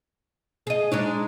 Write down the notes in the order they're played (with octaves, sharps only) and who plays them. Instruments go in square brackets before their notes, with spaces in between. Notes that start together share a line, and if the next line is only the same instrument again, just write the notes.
[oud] G#4 D#5
[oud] G#3 D4 C#5 [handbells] D#4